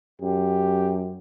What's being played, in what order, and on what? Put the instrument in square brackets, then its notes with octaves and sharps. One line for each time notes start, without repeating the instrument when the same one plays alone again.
[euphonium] F#2 [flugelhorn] G4